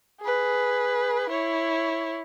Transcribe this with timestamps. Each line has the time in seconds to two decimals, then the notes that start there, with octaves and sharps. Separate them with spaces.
0.21 G#4 B4
1.29 E4 C#5